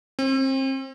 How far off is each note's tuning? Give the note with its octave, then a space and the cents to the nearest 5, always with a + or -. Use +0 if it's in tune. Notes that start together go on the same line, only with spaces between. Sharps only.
C4 +35